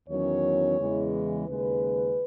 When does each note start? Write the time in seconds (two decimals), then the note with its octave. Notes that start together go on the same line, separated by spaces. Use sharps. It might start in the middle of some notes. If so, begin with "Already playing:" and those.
0.09 E2 D#3 F#3 C#4 C#5
0.79 E2 C#3 E3 G#3
1.48 D#2 C#3 G#3 B4